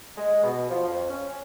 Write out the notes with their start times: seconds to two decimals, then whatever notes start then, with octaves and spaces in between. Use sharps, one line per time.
0.17 G#3
0.43 B2
0.70 F3
0.88 F2
1.10 C#4